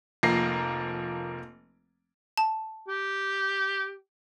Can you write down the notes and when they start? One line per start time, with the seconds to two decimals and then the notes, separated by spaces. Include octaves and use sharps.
0.23 F1 F3 A#3 A#6 C7
2.38 A5
2.88 G4